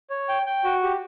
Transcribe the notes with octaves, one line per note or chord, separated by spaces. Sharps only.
C#5
G5
G5
F#4
G4